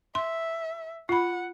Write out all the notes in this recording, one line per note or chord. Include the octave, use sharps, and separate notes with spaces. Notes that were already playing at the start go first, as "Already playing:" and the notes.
E5 C6
F4 F#5 B5